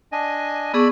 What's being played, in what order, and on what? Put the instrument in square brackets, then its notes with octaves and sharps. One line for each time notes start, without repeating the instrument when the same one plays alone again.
[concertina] D4 D#5 G#5
[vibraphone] B3 G#4 C#6 [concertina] D5 B5 E6